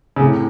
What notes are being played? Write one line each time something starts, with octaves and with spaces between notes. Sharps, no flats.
C#3
A2 C3